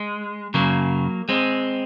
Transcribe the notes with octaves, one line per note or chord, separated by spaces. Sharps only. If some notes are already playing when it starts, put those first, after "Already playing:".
Already playing: G#3
F#2 C#3 F#3 A#3
G#3 C4